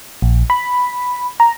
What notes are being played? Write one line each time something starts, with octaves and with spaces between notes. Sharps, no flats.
A#1
B5
A#5